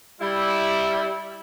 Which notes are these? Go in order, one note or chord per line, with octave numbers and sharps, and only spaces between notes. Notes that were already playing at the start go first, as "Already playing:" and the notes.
G3 E4